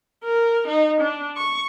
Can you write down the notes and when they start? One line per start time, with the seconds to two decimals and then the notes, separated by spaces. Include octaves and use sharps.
0.23 A#4
0.67 D#4
1.00 D4
1.37 C#6